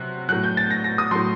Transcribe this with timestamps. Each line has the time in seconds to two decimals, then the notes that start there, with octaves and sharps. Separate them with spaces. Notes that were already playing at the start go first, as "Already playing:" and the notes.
Already playing: C3 F#3 F#6
0.29 A2 F#3 F#6
0.44 G6
0.57 A6
0.70 A#6
0.84 A#6
0.98 D#6
1.11 A2 F#3 C6